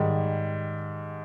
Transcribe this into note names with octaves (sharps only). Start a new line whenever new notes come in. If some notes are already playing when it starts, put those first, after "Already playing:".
Already playing: G#2 D#3 G3